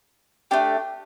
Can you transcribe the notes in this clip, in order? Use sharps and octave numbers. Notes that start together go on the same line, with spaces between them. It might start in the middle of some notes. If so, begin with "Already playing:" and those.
A3 D4 G4